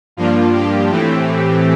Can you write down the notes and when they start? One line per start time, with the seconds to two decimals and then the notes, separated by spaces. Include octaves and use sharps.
0.17 G2 F3 A#3 D4 F4
0.53 G4
0.90 A2 E3 A3 C4